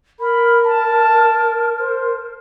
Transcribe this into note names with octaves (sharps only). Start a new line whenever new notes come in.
A#4 B5
A5
C5